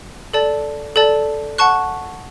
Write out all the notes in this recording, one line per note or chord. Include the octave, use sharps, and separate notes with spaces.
A4 D5 A5
A4 D5 A5
F#5 A5 C#6 F#6